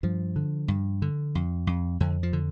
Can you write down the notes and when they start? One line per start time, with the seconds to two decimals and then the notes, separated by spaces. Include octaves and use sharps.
0.03 G2 F3
0.36 D3
0.68 G2
1.02 D3
1.35 F2
1.67 F2
2.00 F2 D3
2.23 F3
2.33 D3